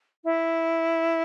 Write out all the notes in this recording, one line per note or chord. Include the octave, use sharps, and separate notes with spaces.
E4